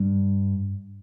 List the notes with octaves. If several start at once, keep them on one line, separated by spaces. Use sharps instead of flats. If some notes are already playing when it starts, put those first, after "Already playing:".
Already playing: G2